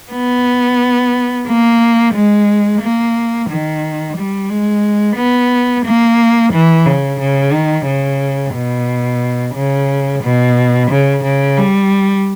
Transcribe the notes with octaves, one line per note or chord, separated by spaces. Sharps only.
B3
A#3
G#3
A#3
D#3
G3
G#3
B3
A#3
E3
C#3
C#3
D#3
C#3
B2
C#3
B2
C#3
C#3
G3